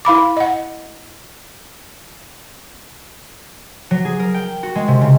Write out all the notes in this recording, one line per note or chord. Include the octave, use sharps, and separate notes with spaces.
E4 F5 B5 D6
D#5 F#5
F#3
G#4
A#4
G5
F#4
G#3
C3
C#3